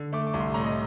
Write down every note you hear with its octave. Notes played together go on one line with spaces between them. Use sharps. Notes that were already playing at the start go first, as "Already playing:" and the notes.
Already playing: D3
A3 D6
D6
C2
C6
A2 A#5
D#5